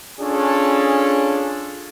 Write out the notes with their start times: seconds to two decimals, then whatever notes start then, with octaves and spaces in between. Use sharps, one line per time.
0.20 C#4 D4 F4 G#4 A4 C#5